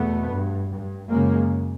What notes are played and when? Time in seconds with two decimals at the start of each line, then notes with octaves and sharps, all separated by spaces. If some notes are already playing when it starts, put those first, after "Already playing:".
Already playing: E2 B2 A3 B3
0.29 G2
0.70 G2
1.08 F#2 C#3 G#3 A#3